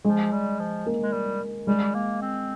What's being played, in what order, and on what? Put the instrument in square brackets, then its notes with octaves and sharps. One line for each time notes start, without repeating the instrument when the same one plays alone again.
[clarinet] F3 [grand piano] G#3
[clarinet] G3
F3
[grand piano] A#3
[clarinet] G#3
G3
[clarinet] G3 [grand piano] G#3
[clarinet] A#3
C4